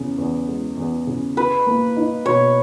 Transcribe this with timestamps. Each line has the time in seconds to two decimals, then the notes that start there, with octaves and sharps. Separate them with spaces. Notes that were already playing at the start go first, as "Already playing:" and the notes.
Already playing: E2 C#3
0.18 E2
0.48 G#3
0.77 E2
1.07 C#3
1.37 G#4 B4
1.67 A#3
1.97 D#4
2.26 B2 C#5